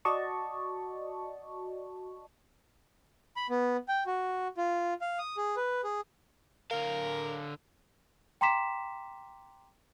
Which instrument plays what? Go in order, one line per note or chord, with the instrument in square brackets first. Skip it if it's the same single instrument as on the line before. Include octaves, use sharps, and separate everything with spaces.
[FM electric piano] F#4 D5 D#5 A5 C#6
[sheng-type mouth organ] B5
B3
G5
F#4
F4
F5
D#6
G#4
B4
G#4
[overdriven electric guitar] D3 F5 [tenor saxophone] A#4
[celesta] G5 A#5 C6 D6 B6 E7